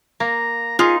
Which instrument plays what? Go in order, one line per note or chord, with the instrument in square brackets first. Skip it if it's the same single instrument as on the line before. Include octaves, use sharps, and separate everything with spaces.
[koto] A#3 [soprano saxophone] A#5
[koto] D#4 [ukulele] F4 [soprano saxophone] G#4